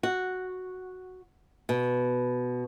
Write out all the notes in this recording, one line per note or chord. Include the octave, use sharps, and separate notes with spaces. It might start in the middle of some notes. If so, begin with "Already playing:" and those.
F#4
B2